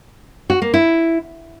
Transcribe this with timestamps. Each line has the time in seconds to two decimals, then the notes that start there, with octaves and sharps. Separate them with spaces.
0.50 F#4
0.62 A#3
0.74 E4